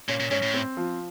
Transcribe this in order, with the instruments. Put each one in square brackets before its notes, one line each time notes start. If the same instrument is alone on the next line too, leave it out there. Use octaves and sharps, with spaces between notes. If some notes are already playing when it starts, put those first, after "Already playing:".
[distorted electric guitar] A#2 [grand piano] C#4
[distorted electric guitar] A#2
[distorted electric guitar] G#2 [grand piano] C#4
[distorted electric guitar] A2
[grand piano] C4
F3